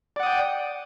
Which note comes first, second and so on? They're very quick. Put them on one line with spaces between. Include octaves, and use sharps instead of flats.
D5 F#5 D#6 G5